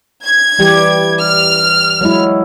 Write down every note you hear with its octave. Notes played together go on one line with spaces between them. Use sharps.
G#6
E3 G3 G4
F6
F#3 G#3 E4